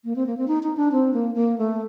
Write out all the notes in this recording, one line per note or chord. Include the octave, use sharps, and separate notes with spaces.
A#3
C4
A#3
C4
D#4
D#4
D4
C4
A#3
A#3
A3